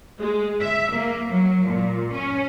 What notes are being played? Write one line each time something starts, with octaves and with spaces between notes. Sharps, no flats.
G#3
E5
A#3
F#3
A#2
C#4